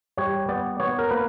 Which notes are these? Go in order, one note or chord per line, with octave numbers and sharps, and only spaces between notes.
G3 C#5
B3 D5
B3 C#5
A#4
A#3 B4